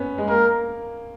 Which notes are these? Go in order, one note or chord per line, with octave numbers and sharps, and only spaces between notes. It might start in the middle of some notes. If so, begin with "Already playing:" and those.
Already playing: B3 C#4
G#3
A#3 A#4